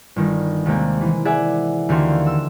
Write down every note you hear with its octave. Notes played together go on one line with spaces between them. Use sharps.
G1 D#3
D#2 C3 G#3 A#3 C4
E3
G#4 D5 E5 F#5 G#5
D#2 D3 D#3 F#4 F5 C6
E6